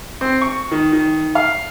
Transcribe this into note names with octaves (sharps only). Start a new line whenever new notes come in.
C4
C#6
D#3
D#3
F5